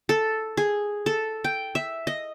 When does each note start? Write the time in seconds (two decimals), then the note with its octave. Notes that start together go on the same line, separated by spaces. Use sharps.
0.09 A4
0.57 G#4
1.06 A4
1.44 G5
1.75 E5
2.07 D#5